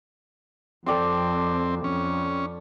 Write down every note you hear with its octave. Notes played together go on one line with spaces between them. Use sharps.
F2 C4 A4 D5 G5
F2 C#4